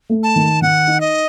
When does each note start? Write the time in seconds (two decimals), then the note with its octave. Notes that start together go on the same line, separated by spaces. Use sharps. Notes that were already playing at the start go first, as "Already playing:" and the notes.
0.09 A3
0.23 A5
0.36 D#3
0.62 D#3 F#5
0.87 D#4
1.00 D#5